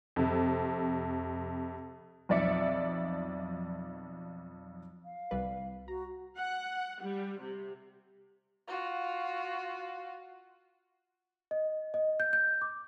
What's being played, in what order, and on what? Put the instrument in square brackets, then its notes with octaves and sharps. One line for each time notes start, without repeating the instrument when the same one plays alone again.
[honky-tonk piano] F2 C3
B1 F2 D5 E5 C#7
[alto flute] F5
[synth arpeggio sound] C2 G3 B4
[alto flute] F#4 [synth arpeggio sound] A#5
[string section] F#5
G3
C3
[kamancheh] F4 F#4
[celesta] D#5
D#5
G6
G6
D6